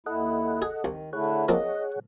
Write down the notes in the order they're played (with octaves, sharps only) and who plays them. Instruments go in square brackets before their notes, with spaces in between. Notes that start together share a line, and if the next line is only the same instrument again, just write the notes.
[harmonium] D#2 E4 [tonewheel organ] A4 D#5 F#5
[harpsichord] G#4
[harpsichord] C2 [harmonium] D#3
[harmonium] D3 A3 E4 [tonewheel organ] G#4 C#5 F#5
[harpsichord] F3 A#3 C4 [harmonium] D#5